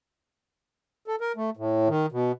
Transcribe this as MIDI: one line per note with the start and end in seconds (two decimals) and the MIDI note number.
1.08 1.16 69
1.21 1.32 70
1.36 1.50 57
1.57 1.88 45
1.88 2.06 51
2.12 2.32 47